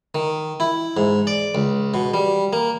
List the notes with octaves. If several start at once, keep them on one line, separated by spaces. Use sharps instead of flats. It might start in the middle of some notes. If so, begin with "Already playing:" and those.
D#3
E4
G#2
D5
C#2
B2
G3
A#3